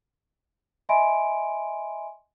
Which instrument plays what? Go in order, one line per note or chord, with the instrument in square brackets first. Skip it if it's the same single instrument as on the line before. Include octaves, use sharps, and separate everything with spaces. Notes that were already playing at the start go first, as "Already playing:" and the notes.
[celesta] D#5 E5 G#5 B5 C6 D7